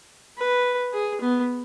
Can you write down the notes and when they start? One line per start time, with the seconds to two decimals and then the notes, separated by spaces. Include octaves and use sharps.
0.38 B4
0.93 G#4
1.21 B3